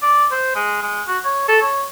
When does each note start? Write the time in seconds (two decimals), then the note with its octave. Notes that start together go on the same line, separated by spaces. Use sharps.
0.02 D5
0.32 C5
0.55 G#3
0.83 G#3
1.07 F#4
1.25 C#5
1.48 A4
1.61 C#5